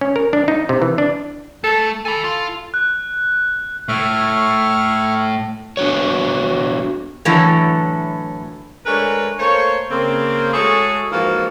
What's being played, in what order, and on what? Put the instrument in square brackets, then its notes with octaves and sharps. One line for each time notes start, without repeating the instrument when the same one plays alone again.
[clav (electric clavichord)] C#4
A#4
D4
D#4
C3
E3
D4
[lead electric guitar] A3 [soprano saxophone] A4
[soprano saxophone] A4 [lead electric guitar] G#5 B5
[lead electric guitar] F4
[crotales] F#6
[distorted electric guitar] A2 [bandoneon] E5 C#6 F6
[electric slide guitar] B3 D4 F#4 C#5
[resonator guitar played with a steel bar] A2 D3 E3 F#3 A3
[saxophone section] G#3 A3 D4 A#4 B4 C#5
A3 A#3 C5 C#5
C#3 A#3 C4
G#3 A3 F#4 G#4 A4 C#5
G#2 E3 F3 A#3 F4 F#4